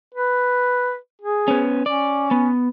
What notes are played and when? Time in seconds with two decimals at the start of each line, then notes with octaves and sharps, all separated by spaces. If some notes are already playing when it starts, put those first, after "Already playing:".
0.14 B4
1.21 G#4
1.48 B3 C#4
1.86 C#4 D5
2.31 B3